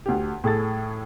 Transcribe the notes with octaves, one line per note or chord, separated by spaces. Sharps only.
D2 G4
A2 G#4 A4 A6